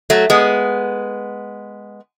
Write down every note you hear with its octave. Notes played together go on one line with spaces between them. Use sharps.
F#3 A3
G#3 B3